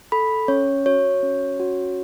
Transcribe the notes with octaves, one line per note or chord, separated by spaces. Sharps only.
A4 B5
C#4 C#5
F#4 C#5
C#4
F#4